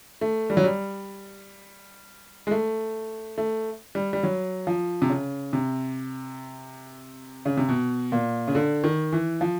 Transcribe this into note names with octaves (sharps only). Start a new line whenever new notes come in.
A3
G3
F#3
G3
G#3
A3
A3
G3
G3
F#3
F3
C3
C#3
C3
C#3
C3
B2
A#2
C#3
D3
D#3
E3
F3